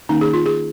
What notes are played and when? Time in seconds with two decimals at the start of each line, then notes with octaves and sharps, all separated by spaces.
0.09 D#3 A#3 C#4 D#4
0.21 G#4
0.33 F4
0.46 G#4